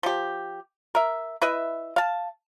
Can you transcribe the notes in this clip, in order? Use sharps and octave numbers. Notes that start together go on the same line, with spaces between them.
F3 G4
A#4 E5
E4 B4 D#5 E5
F5 A5